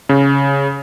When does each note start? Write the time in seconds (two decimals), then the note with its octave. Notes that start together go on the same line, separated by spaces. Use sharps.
0.09 C#3